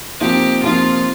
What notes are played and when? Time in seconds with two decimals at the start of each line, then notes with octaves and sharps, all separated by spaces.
0.21 C3 F3 A#3 D#4 G4
0.63 C3 F3 A#3 D#4 F4